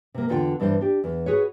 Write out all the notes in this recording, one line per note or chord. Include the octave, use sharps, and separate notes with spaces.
C3 A#3
E2 D3 F4 D#5 G5
G2 E3 D4 A#4 C5
D4 G4
E2
F#4 G#4 B4 C#5